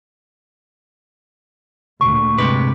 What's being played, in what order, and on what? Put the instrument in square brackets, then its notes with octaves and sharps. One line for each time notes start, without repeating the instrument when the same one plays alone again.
[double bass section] D2 A#2 [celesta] C#6
[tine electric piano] G2 G#3 D6 [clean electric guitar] C3 B4